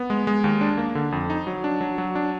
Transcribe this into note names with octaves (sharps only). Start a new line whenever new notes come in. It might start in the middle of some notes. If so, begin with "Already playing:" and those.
Already playing: B3
G#3
G#3
D#2
D4
A#3
D3
F2
D#4
F#3
D4
F#3
F#3
D4